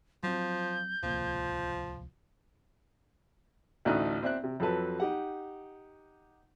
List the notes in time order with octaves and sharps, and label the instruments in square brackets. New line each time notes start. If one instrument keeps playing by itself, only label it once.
[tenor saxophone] F3 [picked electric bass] F#3 C4 [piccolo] G6
[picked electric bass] D1 C2 A#3 [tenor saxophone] F3
[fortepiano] A1 D2 A3 D4 D#4 F#6
C4 D5 E5 F#6
C3
F2 F#3 A4 B4 A5
D#4 G4 F#5